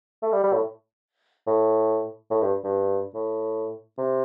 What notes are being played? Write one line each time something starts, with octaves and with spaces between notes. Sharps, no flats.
A3
G3
G3
A2
A2
A2
G2
G2
A2
C3